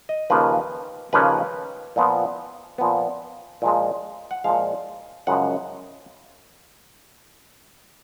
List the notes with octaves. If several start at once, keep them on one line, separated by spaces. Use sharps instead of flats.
D#5
D#2 C#3 F3 A#3 C#4 B4
D#2 C#3 F3 A#3 C#4 B4
A#2 F3 B3
A#2 F3 B3
A#2 F3 G#3
F#5
A#2 F3 G#3 F5
F#2 C#3 F3 G#3 F#5